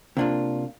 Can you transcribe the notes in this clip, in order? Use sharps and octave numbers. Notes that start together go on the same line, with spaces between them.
C3 A#3 D4 F4